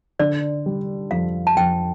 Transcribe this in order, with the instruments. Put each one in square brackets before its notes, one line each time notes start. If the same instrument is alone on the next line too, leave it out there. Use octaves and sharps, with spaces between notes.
[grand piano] D3 [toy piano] D5
[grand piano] G3
[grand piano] F2 [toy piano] F5
[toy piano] A5
[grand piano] F2 [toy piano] G5